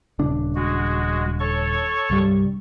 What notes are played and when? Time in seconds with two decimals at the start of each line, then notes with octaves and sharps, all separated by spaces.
0.19 D#1 C#3 D4
0.55 G#3 F#4
1.39 A4 C#5 C#6
2.10 C2 G2 G3